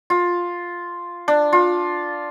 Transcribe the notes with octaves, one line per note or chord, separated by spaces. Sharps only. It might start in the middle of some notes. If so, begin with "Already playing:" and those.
F4
D4
F4